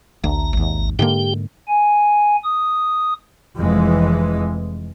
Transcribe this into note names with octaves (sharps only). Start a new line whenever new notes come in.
A1 D2 A#5
G#1 D#2
G#2 D3 A#3 G4 G5
G#5
D#6
F1 F2 E3 G#3